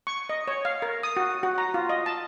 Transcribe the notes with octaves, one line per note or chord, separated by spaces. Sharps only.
C#6
D#5
C#5
F5
A#4
D#6
F#4
F#4
A#5
F4
D#5
A5